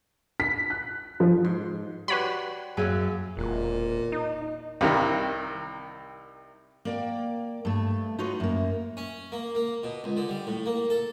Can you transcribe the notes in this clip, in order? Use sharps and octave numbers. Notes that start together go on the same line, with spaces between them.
B6
F#6
F3
G#2 C6
G3 F#4 G4 B4 C#5 B5
F#2 A#3 G#4 E5 F5 D#7
E1 A#2
D#4
C2 C3 D#3
A#3 D5 G5
G2 A3
D#4 F4 F#4 B4 C#5
F#2 A#3
C#4
A#3
A#3
B2
C#2
D3
G3
A2
A#3
A4